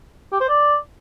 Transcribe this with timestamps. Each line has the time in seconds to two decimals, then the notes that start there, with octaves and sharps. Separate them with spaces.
0.32 G4
0.40 C5
0.49 D5